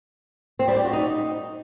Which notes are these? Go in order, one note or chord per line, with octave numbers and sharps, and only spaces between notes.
C4
G3
G4
F#4
D#4